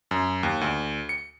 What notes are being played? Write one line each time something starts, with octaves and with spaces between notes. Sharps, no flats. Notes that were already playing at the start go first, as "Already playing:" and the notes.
F#2
D#2
D2
C#7